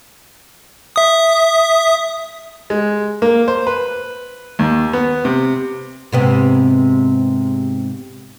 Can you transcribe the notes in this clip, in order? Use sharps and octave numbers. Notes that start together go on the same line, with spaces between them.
E5 D#6
G#3
A#3
C5
B4
D#2
B3
C3
G#2 C3 B3